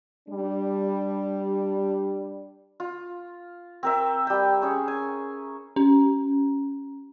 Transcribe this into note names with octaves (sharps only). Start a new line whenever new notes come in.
G3 D4
F4
C4 A#4 E5
G3 G5
C#4 G#4 C#5
G#5
C#4